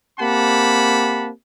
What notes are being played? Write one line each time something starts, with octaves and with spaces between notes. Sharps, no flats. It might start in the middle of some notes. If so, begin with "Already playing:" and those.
A#3 C4 G4 F#5 A5 B5